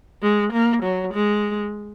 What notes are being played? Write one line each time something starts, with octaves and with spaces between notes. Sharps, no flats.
G#3
A#3
F#3
G#3